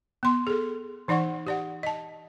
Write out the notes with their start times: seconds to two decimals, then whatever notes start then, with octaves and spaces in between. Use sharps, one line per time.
0.23 B3 C6
0.47 G#4 A4
1.08 E3 D#4 D5 F#5 C#6
1.47 G4 D5 F#5
1.83 D#5 A5